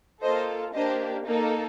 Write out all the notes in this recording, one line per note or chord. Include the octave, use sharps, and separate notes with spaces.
A#3 F4 A4 C5 D#5
A#3 D4 G4 C5 D#5
A#3 D#4 A4